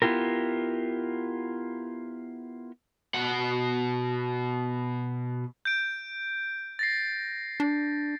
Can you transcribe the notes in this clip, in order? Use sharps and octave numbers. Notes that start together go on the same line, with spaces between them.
B3 E4 F4 G4 A#4
B2 F#5
G6 D7
A6 A#6 C7
D4